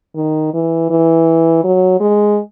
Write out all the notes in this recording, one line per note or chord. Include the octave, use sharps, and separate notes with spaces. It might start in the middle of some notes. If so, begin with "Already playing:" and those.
D#3
E3
E3
F#3
G#3